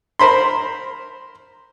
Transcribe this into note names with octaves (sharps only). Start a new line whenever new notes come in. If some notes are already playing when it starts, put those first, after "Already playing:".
A#4 C5 B5 C6